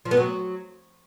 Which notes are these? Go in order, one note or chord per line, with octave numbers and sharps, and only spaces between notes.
F3
B3
F#3